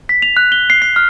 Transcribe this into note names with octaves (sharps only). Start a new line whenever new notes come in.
B6
F7
F#6
G7
C7
C7
F6